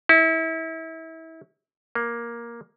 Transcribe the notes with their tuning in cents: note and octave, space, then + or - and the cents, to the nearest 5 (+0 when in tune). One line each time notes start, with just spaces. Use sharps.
E4 -30
A#3 +10